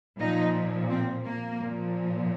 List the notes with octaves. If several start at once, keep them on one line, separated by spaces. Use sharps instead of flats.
A#2 F3 D#4
C4
A#3
A#2 F3